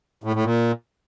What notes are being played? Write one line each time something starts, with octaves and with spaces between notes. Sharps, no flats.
A2
A2
A#2